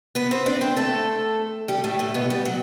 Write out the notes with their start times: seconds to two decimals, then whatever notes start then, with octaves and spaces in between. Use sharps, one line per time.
0.15 B3 B4
0.31 C4 C5
0.46 D4 D5
0.61 C4 C5
0.76 A3 A4
1.68 G3 G4
1.84 A2 A3
1.99 A2 A3
2.14 B2 B3
2.30 G3
2.45 F#3